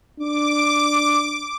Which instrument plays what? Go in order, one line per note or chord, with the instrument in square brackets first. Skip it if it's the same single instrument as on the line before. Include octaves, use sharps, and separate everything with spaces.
[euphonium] D4 [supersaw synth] D6